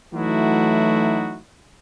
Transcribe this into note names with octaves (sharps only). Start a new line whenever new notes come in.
E3 F#3 A3 D#4 E4 F#4